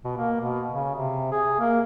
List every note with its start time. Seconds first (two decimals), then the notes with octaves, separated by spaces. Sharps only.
0.04 B2
0.17 A#3
0.41 B2
0.70 C#3
0.95 C3
1.32 G#4
1.60 A#3